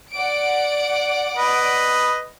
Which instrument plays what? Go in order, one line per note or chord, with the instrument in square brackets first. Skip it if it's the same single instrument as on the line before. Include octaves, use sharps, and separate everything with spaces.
[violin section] D5 F#5 D7
[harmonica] B4 D#5